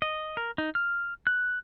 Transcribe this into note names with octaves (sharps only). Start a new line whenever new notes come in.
D#5
A#4
D#4
F6
F#6